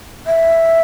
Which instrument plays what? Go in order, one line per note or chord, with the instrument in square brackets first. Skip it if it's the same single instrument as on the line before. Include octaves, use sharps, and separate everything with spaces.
[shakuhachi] E5